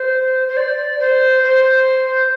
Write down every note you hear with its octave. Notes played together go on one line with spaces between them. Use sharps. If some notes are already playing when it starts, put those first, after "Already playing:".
Already playing: C5
C5
D5
C5
C5